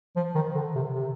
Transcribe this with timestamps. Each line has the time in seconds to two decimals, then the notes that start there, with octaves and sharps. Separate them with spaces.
0.16 F3
0.35 D#3
0.55 D3
0.75 C3
0.94 C3